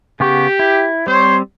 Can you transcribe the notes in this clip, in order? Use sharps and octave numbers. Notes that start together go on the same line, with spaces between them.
C#3 B3 G4 C#6
E4
G3 C4 C5 C#5